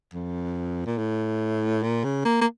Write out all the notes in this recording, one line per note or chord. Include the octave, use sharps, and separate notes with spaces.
F2
A#2
A2
A#2
C#3
A#3
A#3